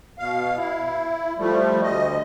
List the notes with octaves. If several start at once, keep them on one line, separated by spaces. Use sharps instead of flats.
B2 F5
E4
F3 G3 A3
D2 D#5